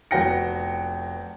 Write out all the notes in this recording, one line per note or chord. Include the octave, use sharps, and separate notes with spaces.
F1 B3 F#4 G5 A#6 C#7